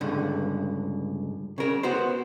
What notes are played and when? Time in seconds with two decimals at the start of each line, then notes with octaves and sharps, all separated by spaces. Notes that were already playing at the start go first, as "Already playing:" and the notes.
0.01 C#2 G2 D3
1.58 C#3 A#4
1.83 B3 F#4 C5